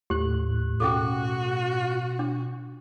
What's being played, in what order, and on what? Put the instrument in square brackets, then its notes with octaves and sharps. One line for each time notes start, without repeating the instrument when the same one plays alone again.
[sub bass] D#2 [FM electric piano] A2 F#6 [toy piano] G4
[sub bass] B2 [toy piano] C#4 G#4 A4 [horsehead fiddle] F#4
[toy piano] D4